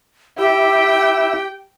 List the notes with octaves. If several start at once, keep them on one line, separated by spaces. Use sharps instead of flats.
E4 G4 E5 G5